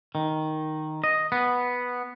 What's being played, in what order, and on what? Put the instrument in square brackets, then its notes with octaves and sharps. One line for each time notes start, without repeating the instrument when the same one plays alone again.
[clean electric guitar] D#3
D#5
B3